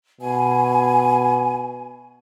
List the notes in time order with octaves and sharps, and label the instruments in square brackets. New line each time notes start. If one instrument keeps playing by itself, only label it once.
[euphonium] B2 [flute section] G#5